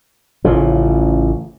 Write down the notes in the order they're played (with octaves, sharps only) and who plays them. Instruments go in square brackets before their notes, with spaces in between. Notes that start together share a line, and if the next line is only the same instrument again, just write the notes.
[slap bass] A1 C#3 F3